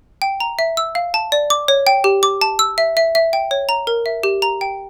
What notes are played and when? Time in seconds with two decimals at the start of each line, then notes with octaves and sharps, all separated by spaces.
0.22 G5
0.40 A#5
0.59 E5
0.77 E6
0.95 F5
1.14 A5
1.32 D5
1.50 D6
1.68 C#5
1.87 G5
2.04 G4
2.23 D6
2.41 A5
2.59 E6
2.78 E5
2.97 E5
3.15 E5
3.33 G5
3.51 C#5
3.69 A#5
3.87 A#4
4.06 E5
4.23 G4
4.42 A#5
4.61 G5